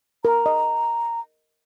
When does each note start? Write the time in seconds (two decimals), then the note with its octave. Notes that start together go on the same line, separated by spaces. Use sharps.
0.25 A#4 A#5
0.46 D#5